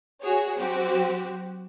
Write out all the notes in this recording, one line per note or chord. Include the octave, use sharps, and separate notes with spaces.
F#4 G#4 C#5
F#3 C4 F#4 G4